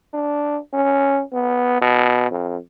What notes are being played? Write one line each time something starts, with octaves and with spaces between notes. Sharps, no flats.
D4
C#4
B3
B2
F2